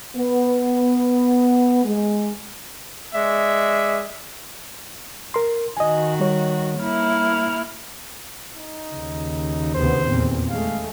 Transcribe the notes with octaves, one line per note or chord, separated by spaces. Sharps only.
B3
G#3
G#3 D5 E5
A#4 C6
D#3 F#4 D#5 G#5
G3 C#5
A#3 E4 F6
D#4
D#2 C#3
D2 C3 B3 C5
E2 A#2 C4
G#3 A3 F5